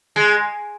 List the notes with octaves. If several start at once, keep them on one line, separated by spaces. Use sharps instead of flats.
G#3